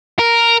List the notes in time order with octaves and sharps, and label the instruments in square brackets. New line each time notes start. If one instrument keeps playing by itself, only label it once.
[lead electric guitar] A#4